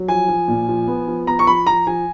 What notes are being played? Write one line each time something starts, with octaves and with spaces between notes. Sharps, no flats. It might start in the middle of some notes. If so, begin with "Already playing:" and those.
Already playing: F#3
F3 G#5
F3
A#2
F3
B3
F3
B3 A#5
C#6
F3 B5
F3 A#5
F3 G#5